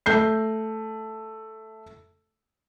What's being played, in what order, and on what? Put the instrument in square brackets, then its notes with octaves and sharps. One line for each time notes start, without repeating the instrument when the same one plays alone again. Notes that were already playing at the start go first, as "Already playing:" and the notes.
[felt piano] A3 G6 C7